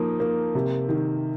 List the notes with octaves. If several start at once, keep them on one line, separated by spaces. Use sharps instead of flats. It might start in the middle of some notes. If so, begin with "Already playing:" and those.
Already playing: F3 A#3 D#4
A#3
C3
D#3